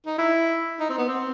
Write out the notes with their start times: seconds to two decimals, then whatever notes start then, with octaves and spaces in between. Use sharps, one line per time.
0.06 D#4
0.18 E4
0.80 D#4
0.89 C4
0.98 B3
1.08 C4